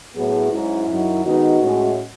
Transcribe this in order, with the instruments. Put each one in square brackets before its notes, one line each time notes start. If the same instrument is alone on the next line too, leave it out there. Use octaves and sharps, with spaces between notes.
[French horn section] A2 F#3 B3 [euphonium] G#4
[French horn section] G#2 F#3 C#4 [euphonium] E4
[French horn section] F#2 D#3 F#3
[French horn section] D#3 G#3 B3 D#4 [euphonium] F#4
[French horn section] A2 G#3 C#4